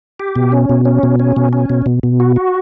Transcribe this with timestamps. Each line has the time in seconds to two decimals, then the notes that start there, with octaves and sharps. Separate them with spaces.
0.20 G4
0.36 B2
0.52 C#4
0.69 B2
0.85 C#4
1.03 B2
1.20 C#4
1.36 B2
1.53 C#4
1.70 B2
1.86 B2
2.03 B2
2.20 F#4
2.36 F#4